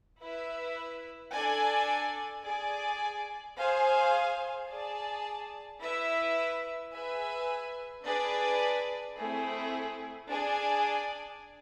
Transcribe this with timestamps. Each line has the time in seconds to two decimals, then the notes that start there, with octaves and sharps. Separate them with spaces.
0.20 E4 B4 E5
1.33 D4 A4 D5 G#5
2.45 G#4 D5 G#5
3.57 G#4 C5 F5 G#5
4.69 G#4 D5 A5
5.82 E4 B4 E5
6.93 G#4 B4 E5 G#5
8.05 D4 G#4 B4 D5
9.17 A3 C4 E4 G#4
10.29 D4 G#4 D5 G#5